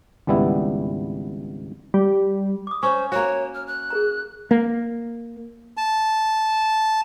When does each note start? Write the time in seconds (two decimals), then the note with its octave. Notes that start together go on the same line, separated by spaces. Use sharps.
0.27 G#1 C#2 G3 B3 E4
1.94 G3
2.67 D6 D#6
2.83 C#4 C5 C#6
3.12 A#3 F#4 C#5
3.54 F6
3.67 F#6
3.90 G#4 A#4 A#5
4.51 A#3
5.77 A5